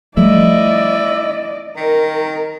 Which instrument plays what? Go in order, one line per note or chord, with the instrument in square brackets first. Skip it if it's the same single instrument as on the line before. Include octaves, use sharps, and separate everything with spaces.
[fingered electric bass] F3 G3 A3 [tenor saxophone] E4 [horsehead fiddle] D5 D#5
[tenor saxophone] D#3 [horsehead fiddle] A#4